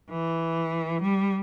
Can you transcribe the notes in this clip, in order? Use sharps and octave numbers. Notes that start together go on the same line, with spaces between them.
E3
G3